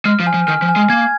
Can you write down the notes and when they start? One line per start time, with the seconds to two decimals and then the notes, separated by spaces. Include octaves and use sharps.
0.05 G#3 F6
0.20 F3
0.27 G#5
0.34 F3
0.47 D#3 F6
0.62 F3
0.69 G#5
0.76 G#3
0.90 A#3 G#6